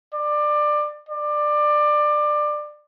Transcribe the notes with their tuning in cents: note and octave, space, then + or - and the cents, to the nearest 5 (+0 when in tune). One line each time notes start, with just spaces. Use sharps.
D5 +20
D5 +20